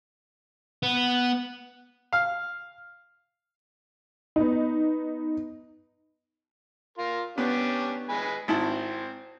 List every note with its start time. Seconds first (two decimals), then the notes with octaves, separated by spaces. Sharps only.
0.83 B3
2.13 F5
4.36 B3 D#4
6.98 F4 A#4 C6
7.38 B3 C#4 D4 G4
8.09 G#3 B4 G#5
8.48 G#1 C4 E4 A5